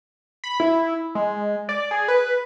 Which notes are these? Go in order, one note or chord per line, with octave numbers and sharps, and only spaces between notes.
B5
E4
G#3
D5
G#4
B4